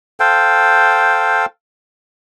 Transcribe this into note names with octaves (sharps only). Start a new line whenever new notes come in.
A4 C5 F5 G5